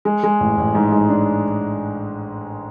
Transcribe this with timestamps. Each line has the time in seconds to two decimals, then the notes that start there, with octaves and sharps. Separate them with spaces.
0.05 G#3
0.23 G#3
0.40 A1
0.57 A1
0.75 G#2
0.92 G#2
1.09 D4